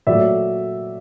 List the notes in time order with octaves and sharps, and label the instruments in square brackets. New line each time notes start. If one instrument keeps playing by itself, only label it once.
[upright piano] A#2 F#3 A3 D5 E5